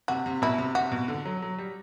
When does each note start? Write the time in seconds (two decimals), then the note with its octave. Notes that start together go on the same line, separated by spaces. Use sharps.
0.08 C3 F#4
0.26 C3
0.42 B2 E4
0.58 C3
0.75 C3 F#4
0.92 B2
1.08 D3
1.25 F#3
1.42 F#3
1.58 G3